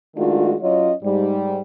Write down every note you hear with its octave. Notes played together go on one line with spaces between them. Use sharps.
D#3 G#3 A3 D4 F4 F#4
F#3 C#4 F4 C#5 D#5
G#2 G3